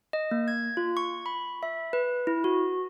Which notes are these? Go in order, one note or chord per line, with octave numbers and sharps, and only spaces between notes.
D#5
A#3
G#6
F4
C#6
B5
E5
B4
E4
F#4